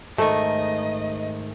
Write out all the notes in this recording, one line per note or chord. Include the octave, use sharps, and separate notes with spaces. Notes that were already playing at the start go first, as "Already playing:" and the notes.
G#2 D#3 A3 A4 D#5